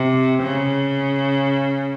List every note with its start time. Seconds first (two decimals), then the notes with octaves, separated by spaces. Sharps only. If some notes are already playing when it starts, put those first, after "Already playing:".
Already playing: C3
0.43 C#3